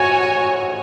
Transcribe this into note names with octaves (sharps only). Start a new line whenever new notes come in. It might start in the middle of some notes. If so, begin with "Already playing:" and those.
Already playing: F#4 C#5 G#5 G#6